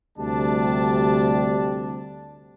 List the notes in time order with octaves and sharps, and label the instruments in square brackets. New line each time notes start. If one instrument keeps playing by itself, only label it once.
[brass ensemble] D2 C3 G3 D4 A5